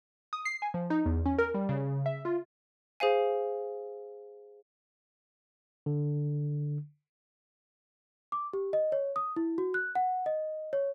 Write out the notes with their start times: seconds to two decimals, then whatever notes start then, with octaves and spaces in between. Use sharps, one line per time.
0.33 D#6
0.45 C7
0.62 G#5
0.74 F3
0.90 D#4
1.06 E2
1.26 C#4
1.39 A#4
1.54 G3
1.69 C#3
2.06 E5
2.25 F4
3.00 G#4 C5 F5 G#5
5.86 D3
8.32 D6
8.53 G4
8.73 D#5
8.92 C#5
9.16 D#6
9.36 E4
9.58 F#4
9.74 F#6
9.95 F#5
10.26 D#5
10.73 C#5